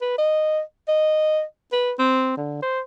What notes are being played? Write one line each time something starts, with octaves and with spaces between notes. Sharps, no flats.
B4
D#5
D#5
B4
C4
D3
C5